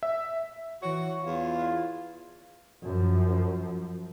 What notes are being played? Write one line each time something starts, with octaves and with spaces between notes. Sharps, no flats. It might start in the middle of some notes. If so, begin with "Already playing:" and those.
E5
E3 F#4 C#5
E2 F4
F#2 F3